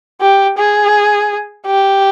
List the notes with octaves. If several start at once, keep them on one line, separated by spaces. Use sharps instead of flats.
G4
G#4
G4